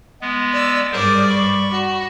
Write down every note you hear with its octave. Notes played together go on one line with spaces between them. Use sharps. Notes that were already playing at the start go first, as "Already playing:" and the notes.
G#3 B3
D5 E6
G2 G#4 A#4 C5 D5
B5 C#6
F#4